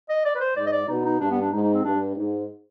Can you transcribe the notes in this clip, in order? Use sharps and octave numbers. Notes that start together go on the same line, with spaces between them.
D#5
D5
B4
C5
G#2 D5
D#5
D5
B2 D#4
D#4
G2 D4
B3
D4
G#2 D#4
D#4
C4
G2 D4
G#2